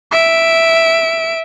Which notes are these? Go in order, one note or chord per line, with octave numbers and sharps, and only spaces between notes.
E5 D7